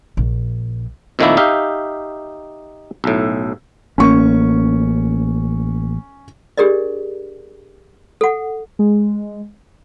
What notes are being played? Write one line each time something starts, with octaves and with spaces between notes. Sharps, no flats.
A#1
F2 A#2 D#3 A3 A#3 E4
D#4 G4 E5 F5
B1 A2
A1 A#3 C#4 C#6
D4 G4 G#4 A#4 D5 D#5
A4 F#5
G#3